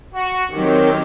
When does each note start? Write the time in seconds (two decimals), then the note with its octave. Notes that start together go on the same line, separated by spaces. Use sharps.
0.14 F#4
0.53 D#3 F#3 C4 G4